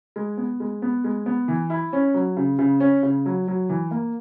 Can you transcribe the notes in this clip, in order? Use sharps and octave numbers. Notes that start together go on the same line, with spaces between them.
G#3
B3
G#3
B3
G#3
B3
E3
E4
C#4
F#3
C#3
C#3
C#4
C#3
F#3
F#3
E3
A#3